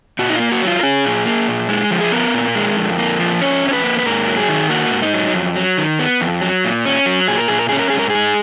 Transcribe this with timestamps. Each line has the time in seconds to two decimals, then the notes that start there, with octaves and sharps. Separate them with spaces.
0.19 A#2 F#4
0.30 D#4
0.35 A#3 F4
0.52 F#4
0.62 F#3
0.67 F4
0.79 A#4
0.83 C#4 G#4
1.05 A#2
1.26 A#3
1.48 A#2
1.69 G#3
1.91 F3
2.00 G#4
2.12 B3 A#4
2.34 A#2
2.55 G#3
2.77 F2
2.98 A#3
3.19 F3
3.41 C#4 C#5
3.63 F2
3.69 C#5
3.73 B4
3.84 A#3
3.99 B4
4.06 G#2 A#4
4.27 F#3
4.37 G#4
4.49 D#3
4.70 A#3 F#4
4.91 G#2
5.02 D#4
5.13 F#3
5.34 F2
5.56 F#3
5.78 D#3
5.99 B3
6.21 F2
6.41 F#3
6.64 A#2
6.86 C#4
7.06 F#3
7.28 A#2 G#4
7.38 A#4
7.48 A#2 G#4
7.59 A#4
7.69 C#4 G#4
7.79 A#4
7.90 G#2 G#4
7.99 A#4
8.10 G#3 G#4